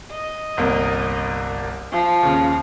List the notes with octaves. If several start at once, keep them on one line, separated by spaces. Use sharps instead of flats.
D#5
G1 C2 A#3
F3
D#2 C#3